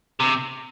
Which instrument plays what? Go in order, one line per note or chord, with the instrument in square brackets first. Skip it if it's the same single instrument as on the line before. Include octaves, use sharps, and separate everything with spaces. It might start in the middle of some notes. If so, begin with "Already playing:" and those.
[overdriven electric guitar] C3